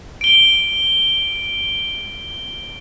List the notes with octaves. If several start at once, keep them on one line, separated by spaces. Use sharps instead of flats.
D7 G7